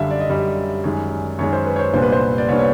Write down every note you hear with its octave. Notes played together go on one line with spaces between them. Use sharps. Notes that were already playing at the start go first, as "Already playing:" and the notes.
Already playing: F#2 D3 G3 E5 F5
D5
D#5
F#2 D3 G3 D5
F#2 D#3 G#3
F#2 D#3 G#3 C#5
C5
B4
C#5
C5
C2 A#2 G3 B3 D4 C5
B4
C5
D5
C2 A#2 G3 B3 D4 C#5
C#5